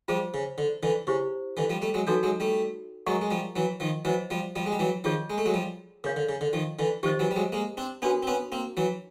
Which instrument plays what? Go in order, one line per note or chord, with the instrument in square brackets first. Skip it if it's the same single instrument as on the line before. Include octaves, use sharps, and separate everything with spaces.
[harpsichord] F3 G3 [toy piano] F4 G#4 C5
[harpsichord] C#3
D3
D3 E3
[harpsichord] C#3 [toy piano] E4 G4 C5
[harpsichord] D3 E3
F3 G3
G3 A3
F#3 G#3
[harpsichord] E3 F#3 [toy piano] D#4 F#4 A4 C#5
[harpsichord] F#3 G#3
G3 A3
[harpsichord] F#3 G#3 [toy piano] A#4 D#5 F#5 A#5 C#6
[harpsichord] G#3
F3 G3
E3 F#3
D#3 F3
[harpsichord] E3 F#3 [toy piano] C5 D#5 F#5
[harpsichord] F3 G3
F3 G3
G#3
G3
E3 F#3
[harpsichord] D#3 F3 [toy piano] F4 G#4 C#5
[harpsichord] G#3
A3
F#3 G#3
F3 G3
[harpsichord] C#3 [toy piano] A#4 C#5 F5
[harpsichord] D3
C#3
D3
D#3 F3
D3 E3
[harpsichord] D#3 F3 [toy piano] G4 C5 D#5
[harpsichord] E3 F#3
G3
F#3 G#3
G#3 A#3
C4 D4
[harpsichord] B3 C#4 [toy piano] D4 F#4 A#4
[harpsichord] C4
B3 C#4
A#3 C4
E3 F#3